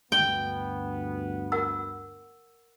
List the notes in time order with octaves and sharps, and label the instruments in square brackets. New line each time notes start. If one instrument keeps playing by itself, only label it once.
[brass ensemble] D2 G2 B3 [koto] G5
[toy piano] A#4 F#5 E6